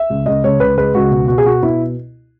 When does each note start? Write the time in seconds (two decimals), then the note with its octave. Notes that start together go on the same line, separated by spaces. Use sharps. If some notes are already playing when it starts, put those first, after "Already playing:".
Already playing: E5
0.10 C#2
0.26 C#2 D#5
0.44 C#2 C#5
0.60 C#2 B4
0.78 G#3 B4
0.95 C#2 F#4
1.11 B2
1.28 B2 F#4
1.38 G#4
1.45 B2 F#4
1.63 B2 E4